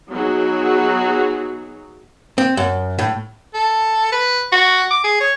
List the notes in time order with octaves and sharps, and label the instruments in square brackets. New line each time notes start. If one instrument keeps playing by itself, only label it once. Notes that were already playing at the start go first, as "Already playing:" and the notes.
[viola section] F#3 B3 D#4 F#4 G#4
[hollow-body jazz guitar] C4
F#2
A2
[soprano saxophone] A4
B4
F#4
D6
G#4
C#5